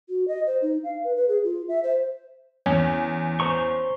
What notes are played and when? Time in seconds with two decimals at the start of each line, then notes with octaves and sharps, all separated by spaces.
0.09 F#4
0.28 D#5
0.47 C5
0.62 D#4
0.84 F5
1.04 B4
1.17 B4
1.29 G#4
1.44 F4
1.68 E5
1.84 C5
2.66 E2 C#4
3.40 C5 A#5 C#6